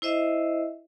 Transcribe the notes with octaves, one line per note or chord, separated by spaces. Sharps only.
E4 C5 D#5 E5